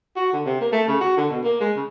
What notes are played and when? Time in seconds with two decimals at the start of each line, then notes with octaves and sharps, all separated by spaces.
0.16 F#4
0.33 D3
0.46 C3
0.60 A#3
0.72 A3
0.88 C#3
1.01 F#4
1.17 D3
1.30 B2
1.44 A#3
1.61 G#3
1.76 C#3